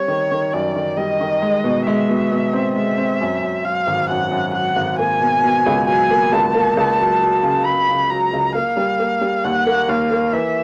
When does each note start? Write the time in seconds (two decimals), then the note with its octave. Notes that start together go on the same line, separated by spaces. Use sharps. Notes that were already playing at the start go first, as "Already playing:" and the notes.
Already playing: G3 C4 C#5
0.08 D#3
0.32 D#3
0.53 F#2 D5
0.76 D#3
0.97 G3 D#5
1.21 D#3
1.42 G#3
1.64 B2
1.86 G#3 E5
2.09 B2
2.32 B2
2.53 C4
2.76 G#3 E5
2.98 C4
3.21 F#2
3.42 F#2
3.64 F#3 F5
3.87 G#1
4.09 F#2 F#5
4.31 F#2
4.54 F#3 F#5
4.76 G#1
4.98 A#3 G#5
5.20 B2
5.43 B2
5.66 C#2
5.87 F#3 G#5
6.11 A#3
6.32 C#2 A5
6.54 A#3
6.77 C#2
7.00 F#3
7.22 F#3
7.43 C#3
7.65 C#3 B5
7.89 C#3
8.10 F#3 A#5
8.33 C#2
8.55 A#3 F5
8.77 G3
8.99 A#3
9.21 G3
9.44 D#2 F#5
9.67 A#3
9.88 D#2 F5
10.11 A#3
10.33 E3 E5